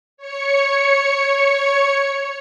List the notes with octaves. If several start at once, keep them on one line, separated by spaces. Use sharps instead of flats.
C#5 C#7